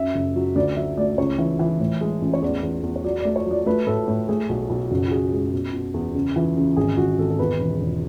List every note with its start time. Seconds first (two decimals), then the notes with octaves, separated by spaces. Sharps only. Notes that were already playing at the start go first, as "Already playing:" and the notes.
Already playing: F#2 E5
0.15 F#1
0.35 F#3
0.56 D2 D5
0.77 F#3 E5
0.98 A3 D5
1.18 C#2 C#5
1.38 E3
1.59 E3
1.80 A2
2.01 G#3
2.21 A1
2.34 C#5
2.42 E2 D5
2.63 E2
2.83 E2
2.96 C#5
3.04 F#3 D5
3.20 A3 D5
3.36 C#5
3.46 F#3 D5
3.66 A3 B4
3.87 A2 A4
4.08 A2
4.28 A3 G#4
4.49 B1
4.70 B1
4.90 F#1 F#4
5.07 F#4
5.11 F#2 G#4
5.32 G#3
5.53 B2
5.73 B2
5.94 E2
6.15 C#3
6.36 E3
6.56 C#3
6.77 G#1 G#4
6.97 G#1 F#4
7.18 G#1 A4
7.30 A4
7.39 E2 B4
7.60 E1
7.81 E1